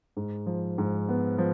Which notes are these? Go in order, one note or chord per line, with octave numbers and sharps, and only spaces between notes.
G#2
F3
G#2
B3
F3